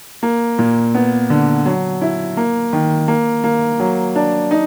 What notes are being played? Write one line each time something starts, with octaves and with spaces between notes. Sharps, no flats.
A#3
A#2
B3
D3
F#3
E4
A#3
D#3
A#3
A#3
F#3
D4
D#4